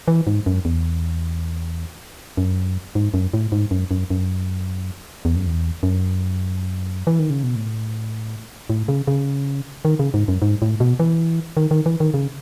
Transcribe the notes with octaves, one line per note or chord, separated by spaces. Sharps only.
E3
G#2
F#2
E2
F#2
G#2
F#2
A2
G#2
F#2
F#2
F#2
E2
F#2
E2
F#2
E3
D#3
C#3
B2
A2
A2
C#3
C#3
D#3
C#3
G#2
F#2
G#2
A2
B2
E3
D#3
D#3
E3
D#3
C#3